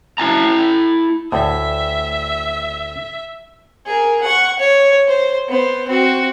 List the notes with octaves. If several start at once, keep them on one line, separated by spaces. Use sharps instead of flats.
E4 A5 A#5
D2 A2 E5
G#4 A#4
F#5 C#6
C#5
C5
B3 C5
C4 F#4